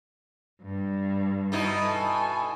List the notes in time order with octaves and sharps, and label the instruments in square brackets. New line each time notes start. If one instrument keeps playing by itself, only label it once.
[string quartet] G2
[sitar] B2 D#4 E4
[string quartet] A4 G#5